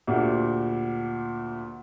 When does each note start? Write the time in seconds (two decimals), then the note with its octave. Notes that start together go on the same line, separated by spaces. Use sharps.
0.07 D2 A#2 G4